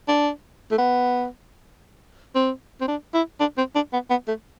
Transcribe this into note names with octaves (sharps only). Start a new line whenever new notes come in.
D4
A3
B3
C4
C4
D4
E4
D4
C4
D4
B3
B3
A3